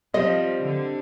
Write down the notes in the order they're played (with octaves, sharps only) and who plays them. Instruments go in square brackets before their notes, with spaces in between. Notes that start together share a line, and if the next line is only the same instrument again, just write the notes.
[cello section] F3 [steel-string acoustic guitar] G3 C4 [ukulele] D#5
[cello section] D3